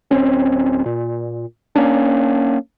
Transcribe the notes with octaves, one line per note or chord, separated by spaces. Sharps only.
D1 G1 C4 C#4
A#2
A#3 C#4 D4